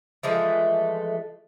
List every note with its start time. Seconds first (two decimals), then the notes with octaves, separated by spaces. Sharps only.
0.23 E3 F3 G#3 A3